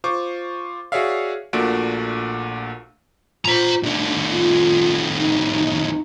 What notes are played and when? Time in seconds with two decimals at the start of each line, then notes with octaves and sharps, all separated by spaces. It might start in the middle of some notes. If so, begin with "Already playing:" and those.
0.04 F4 C5 C#6 D6
0.92 F#4 G#4 C#5 D5 E5 F5
1.53 A#1 A#2 A3 D4 F#4 D7
3.45 F4 C5 A#5
3.83 C2 A3 D4
4.31 F4
5.18 D#4